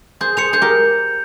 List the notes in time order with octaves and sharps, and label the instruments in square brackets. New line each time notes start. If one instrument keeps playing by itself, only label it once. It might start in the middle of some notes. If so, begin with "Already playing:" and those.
[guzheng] G#4 C5 [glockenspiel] G6
[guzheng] G#4 C5 [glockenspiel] C#7 F7
[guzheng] G#4 C5 [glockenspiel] G6
[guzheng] G4 A#4